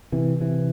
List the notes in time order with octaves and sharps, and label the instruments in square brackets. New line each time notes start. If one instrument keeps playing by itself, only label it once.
[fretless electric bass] C3 E3
C3 E3